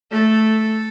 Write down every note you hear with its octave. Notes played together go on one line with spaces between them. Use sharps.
A3 A4